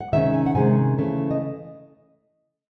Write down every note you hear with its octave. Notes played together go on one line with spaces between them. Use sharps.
F#5
C3 D#3 G#3 C#4 E5
G#5
F#5
C3 D#3 G#3 C#4 G#5
C#3 E3 A3 C#4
D#5